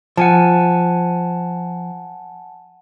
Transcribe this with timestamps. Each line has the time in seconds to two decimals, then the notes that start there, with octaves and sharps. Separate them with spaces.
0.17 F3 F#5 G#5 A5